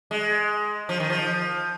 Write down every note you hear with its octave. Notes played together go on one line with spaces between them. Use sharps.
G#3
F3
D#3
F3